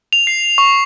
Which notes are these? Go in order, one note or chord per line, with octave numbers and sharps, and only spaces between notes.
F7
C7
C#6